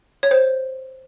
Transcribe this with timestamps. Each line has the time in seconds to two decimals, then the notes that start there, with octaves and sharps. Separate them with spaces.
0.23 C#5
0.31 C5